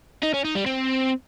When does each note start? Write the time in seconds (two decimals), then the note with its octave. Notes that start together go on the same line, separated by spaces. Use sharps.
0.23 D#4
0.34 C#4
0.45 D#4
0.55 G3
0.66 C4